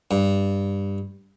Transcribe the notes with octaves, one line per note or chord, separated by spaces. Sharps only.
G2